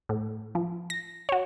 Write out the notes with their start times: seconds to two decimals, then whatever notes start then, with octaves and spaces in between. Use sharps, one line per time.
0.09 A2
0.55 F3
0.90 A#6
1.29 F#4 C#5